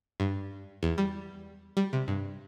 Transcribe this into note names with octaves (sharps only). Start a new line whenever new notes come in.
G2
E2
G3
G3
C3
G2